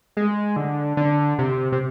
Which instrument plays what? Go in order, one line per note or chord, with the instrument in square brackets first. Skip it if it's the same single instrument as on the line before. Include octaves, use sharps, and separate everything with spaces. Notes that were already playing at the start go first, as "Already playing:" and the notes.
[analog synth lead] G#3
D3
D3
C3
C3